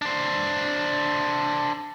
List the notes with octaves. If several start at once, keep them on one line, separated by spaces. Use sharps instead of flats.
D4 C5